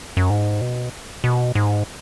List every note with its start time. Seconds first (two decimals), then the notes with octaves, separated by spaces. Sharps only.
0.17 F#2
0.30 G#2
0.61 B2
1.24 B2
1.55 G#2